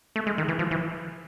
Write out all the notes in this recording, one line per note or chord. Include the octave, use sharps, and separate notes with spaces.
A3
G#3
D#3
E3
F3
E3